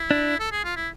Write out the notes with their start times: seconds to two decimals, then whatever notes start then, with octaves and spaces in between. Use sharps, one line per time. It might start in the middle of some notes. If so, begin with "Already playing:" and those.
Already playing: E4
0.11 D4
0.40 A4
0.52 G#4
0.64 F4
0.76 E4